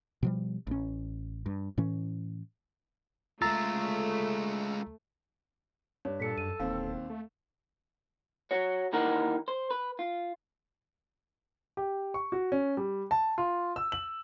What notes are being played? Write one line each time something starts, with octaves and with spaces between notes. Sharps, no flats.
B2 F3 G3
A1 C#4
G2
A2 E3 C#4
G#3 A3 F4 A#5 E6 A6
G2 C#5
A#2 A4 B6 C#7
F#2 D#7
E1 D#2 C4 F5
A3
F#4 C#5
D#2 E3 D#4 G4 A#4 F#5
C5
B4
F4
G4
C#6
F#4
C#4
G3
A5
F4
E6
F#7